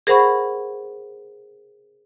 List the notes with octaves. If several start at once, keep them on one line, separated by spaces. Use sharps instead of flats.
G#4 A#4 C5 F#5 B5 C#6